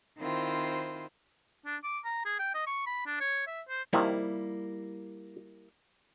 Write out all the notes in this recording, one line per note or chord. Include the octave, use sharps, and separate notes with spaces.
D#3 C4 E4 F4 C5
D4
D6
A#5
G#4
G5
D#5
C#6
B5
D4
C#5
E5
C5
C3 D#3 F3 G3 A#3 E4